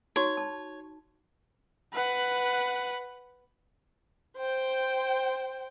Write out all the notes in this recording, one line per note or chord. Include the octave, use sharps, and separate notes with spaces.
D#4 F#4 C#5
A5
B4 F#5
C5 G5